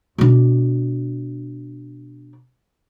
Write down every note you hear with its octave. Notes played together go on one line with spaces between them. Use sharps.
B2 D4